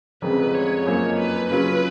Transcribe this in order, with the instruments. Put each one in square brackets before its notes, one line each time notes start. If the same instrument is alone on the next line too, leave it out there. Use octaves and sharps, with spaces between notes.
[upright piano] F1 F2 C#3 G#3 [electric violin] B4
[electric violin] C#5
[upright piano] F#2 F3 A#3 D#4 A#4 [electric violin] C#5
[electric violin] B4
[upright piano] C#3 F#3 C#4 F4 [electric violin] B4